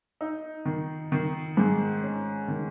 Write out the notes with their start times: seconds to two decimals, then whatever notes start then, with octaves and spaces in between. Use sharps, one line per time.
0.21 D#4
0.65 D#3
1.12 D#3
1.57 G#2
2.03 C#4
2.48 D#3